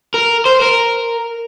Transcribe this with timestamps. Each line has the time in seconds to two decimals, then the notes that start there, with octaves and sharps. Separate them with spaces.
0.14 A#4
0.46 C5
0.62 A#4